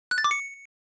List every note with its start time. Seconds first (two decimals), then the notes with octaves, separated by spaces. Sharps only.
0.11 F#6
0.18 A6
0.24 D6
0.31 C#7